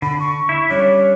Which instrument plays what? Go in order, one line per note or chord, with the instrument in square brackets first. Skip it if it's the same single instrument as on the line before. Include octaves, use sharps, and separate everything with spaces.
[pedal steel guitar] D3 [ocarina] B5
[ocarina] C#6
[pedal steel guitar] E4 E5
[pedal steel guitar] G3 C#4 D4 [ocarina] C#5